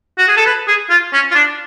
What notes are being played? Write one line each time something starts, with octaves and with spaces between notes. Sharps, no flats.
F#4
G#4
A4
B4
G#4
F4
C#4
F4
D4